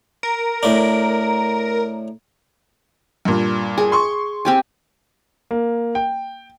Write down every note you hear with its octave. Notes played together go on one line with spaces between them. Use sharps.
A#4
A2 D4
G2 A#2
G#4
C6 C#6
C4 G4 G#5
A#3
G5